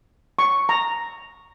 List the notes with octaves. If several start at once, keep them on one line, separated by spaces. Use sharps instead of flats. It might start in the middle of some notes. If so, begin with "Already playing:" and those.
C#6
A#5